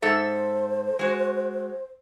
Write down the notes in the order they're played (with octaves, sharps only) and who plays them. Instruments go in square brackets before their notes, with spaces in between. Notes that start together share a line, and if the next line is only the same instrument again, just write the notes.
[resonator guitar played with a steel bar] G#2 A4 E5 [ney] C5
[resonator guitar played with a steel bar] G#3 F#4